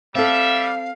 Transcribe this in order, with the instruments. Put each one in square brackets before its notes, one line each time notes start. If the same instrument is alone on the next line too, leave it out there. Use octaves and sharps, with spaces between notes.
[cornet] G3 [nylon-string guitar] C4 A4 [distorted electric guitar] E5 [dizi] F5